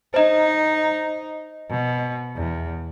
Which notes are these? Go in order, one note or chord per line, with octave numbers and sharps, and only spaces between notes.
D#4 C5 D#5
B2
E2